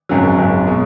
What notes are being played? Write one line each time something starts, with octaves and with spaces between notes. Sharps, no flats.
G#1 F#2 C#3 F#3
G#1 F#2 C#3 F#3
B2 G#3